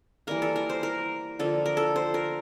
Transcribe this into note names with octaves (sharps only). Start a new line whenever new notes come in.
E3 G3 A#3 A#4
A4
A#4
C5
A#4
D3 F3 A#3 A4
A#4
A4
C5
A#4